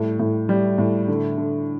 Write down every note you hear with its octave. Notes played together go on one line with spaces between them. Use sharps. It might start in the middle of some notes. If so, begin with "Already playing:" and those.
Already playing: A2 G3
A2
G3
A2
D3
D3